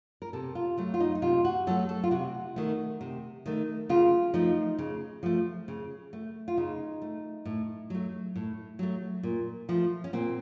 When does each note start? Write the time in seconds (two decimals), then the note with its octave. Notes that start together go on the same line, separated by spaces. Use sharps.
0.22 A#4
0.33 C3 A4
0.55 F4
0.78 F#3 A3
0.94 F4
1.00 D#4
1.15 D#4
1.22 C3 F4
1.45 F#4
1.67 F#3 A3 A4
1.89 A4
2.04 F4
2.11 C3 F#4
2.56 D#3 A3
3.01 C3
3.46 D#3 A3
3.89 C#3 F4
4.34 F3 A3 D#4
4.79 C#3
5.23 F3 A3
5.68 C#3
6.13 A3
6.48 F4
6.57 C#3 D#4
7.02 A3
7.45 A2
7.90 F#3 A3
8.36 A2
8.79 F#3 A3
9.23 A#2
9.69 F3 A3
10.04 C#4
10.13 A#2 C4